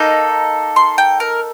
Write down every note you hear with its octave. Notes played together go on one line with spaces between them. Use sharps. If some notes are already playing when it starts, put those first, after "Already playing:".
Already playing: A#3 D#4 A4 D#5
C6
G5
A#4